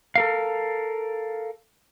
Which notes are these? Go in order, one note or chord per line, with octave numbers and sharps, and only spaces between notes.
A4 A#4 F5